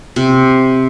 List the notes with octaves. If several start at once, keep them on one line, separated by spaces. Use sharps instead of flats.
C3